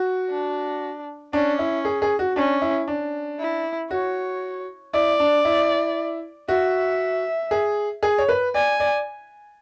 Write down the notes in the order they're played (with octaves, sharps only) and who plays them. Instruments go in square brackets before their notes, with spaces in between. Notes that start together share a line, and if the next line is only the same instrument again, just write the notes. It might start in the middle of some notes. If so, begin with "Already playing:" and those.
Already playing: [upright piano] F#4
[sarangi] D4
[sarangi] C#4 [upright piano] D4
[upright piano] E4
G#4
G#4
F#4
[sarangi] C#4 [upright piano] D4
[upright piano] E4
D4
[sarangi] E4
[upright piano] F#4 [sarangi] C#5
[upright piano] E4 [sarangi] D5
[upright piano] D4
E4
[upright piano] F#4 [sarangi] E5
[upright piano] G#4
G#4
C#5
B4
[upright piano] D5 [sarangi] G#5
[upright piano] D5